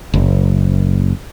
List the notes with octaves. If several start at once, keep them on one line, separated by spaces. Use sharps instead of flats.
F#1